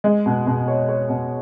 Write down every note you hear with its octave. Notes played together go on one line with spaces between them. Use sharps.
G#3
B2
B2
C#5
C#5
B2